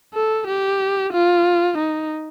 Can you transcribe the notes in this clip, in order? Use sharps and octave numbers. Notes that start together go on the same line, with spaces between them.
A4
G4
F4
D#4